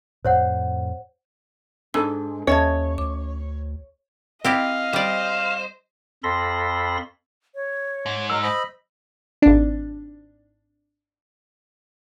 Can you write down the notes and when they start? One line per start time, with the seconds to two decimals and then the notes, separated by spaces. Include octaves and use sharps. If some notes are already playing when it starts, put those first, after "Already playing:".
0.25 F2 A2 C5 C#5 F#5
1.94 G#2 D4 A4 E6
2.47 D#2 C#4 A4 C#5 D#5 E5 A5
2.98 D2 D6
4.44 C4 E4 G4 D#5 F5
4.93 G3 C5 D5
6.23 F2 A4 B5 C6 A#6
7.55 C#5
8.06 G#2
8.30 F#3 A#4 D#5 E6
8.43 C5 D#5 B5
9.42 G#1 D4